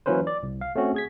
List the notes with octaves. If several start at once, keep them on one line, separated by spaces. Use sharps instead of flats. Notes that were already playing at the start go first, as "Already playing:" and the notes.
E3 F#3 A#3 C#4 B4 C5
D5
C2
F5
A3 C4 C#4 F#4
G#4 G#6 B6